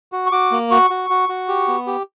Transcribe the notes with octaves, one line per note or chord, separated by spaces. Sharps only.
F#4
C#6
F#4 D6
A#3
F#4 C#6
F#4
F#4
F#4
G4
B3
G4